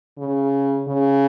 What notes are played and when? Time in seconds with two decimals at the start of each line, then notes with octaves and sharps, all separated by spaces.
0.19 C#3
0.87 C#3